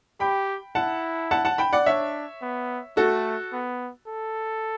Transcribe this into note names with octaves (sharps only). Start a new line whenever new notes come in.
G4 G5 B5
E4 F#5 A5
F#5 A5
F#5 A5
G5 B5
D5 F#5
D4 C#5 E5
B3
A3 F#4 A4
B3
A4